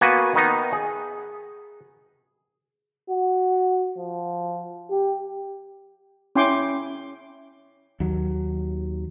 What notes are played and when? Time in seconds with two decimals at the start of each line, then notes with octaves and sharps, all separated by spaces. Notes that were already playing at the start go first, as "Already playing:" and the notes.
0.01 A#3 B3 F#4 B4 G#5
0.35 D#3 B3 D#4
0.73 G#4
3.10 F#4
3.97 F3
4.90 G4
6.35 C#4 E4 G5 G#5 C6 D6
8.00 D#2 F#3